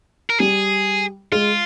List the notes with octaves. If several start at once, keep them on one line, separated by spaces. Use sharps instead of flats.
A#4
G3 G#4
G#3 F4